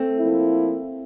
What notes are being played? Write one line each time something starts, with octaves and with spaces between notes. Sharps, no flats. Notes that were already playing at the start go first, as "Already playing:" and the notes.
Already playing: A3 C4
F3 A#3 E4